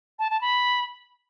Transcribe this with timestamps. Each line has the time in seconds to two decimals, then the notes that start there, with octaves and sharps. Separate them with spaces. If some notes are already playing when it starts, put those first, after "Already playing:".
0.19 A5
0.30 A5
0.41 B5